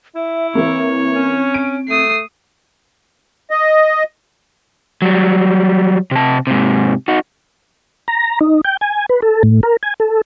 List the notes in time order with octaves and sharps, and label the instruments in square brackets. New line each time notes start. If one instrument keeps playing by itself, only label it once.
[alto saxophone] E4 [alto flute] E5
[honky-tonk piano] E3 A#3 [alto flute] C4 [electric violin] C#5
[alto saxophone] C#4
[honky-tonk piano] D7
[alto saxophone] A3 [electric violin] D#6 C7
[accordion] D#5
[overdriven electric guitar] F#3 G3
C3 A5
G#2 C3
D#4 F#4
[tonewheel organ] A#5
D#4
G5
G#5
B4
A4
A2
A#4
G#5
A4